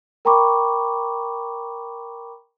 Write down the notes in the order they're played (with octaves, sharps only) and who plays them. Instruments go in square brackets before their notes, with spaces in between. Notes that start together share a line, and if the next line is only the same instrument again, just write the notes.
[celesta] A#4 G5 A#5 B5 C#6 D6